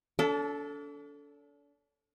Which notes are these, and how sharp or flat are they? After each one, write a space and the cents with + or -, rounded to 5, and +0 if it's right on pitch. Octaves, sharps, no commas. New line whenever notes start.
D4 -40 A4 +0